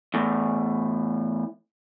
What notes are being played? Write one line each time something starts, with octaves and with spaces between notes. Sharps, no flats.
E2 A2